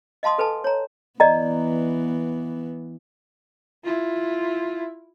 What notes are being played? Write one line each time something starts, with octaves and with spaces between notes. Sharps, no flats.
D#5 F5 A5 C6 D#6
A4 B4 G#5 A5
C#5 A#5
E3 B3 D5 D#5 A#5
E4 F4